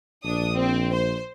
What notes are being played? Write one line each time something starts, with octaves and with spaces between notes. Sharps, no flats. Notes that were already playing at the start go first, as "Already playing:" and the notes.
A#1 D4 D#6
C4
C5